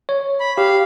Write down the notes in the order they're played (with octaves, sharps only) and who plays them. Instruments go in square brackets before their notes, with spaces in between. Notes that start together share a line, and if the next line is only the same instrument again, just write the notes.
[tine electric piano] C#5
[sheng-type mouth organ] B5
[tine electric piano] G4 [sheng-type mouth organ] F5